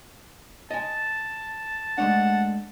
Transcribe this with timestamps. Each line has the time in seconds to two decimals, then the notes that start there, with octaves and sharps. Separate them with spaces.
0.70 D#5 G#5 A5
1.98 G#3 A3 D4 F#5